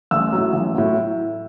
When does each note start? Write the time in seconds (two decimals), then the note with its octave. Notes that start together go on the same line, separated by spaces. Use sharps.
0.11 A1 E6
0.32 A2 F#3
0.53 A1
0.75 A2 F#3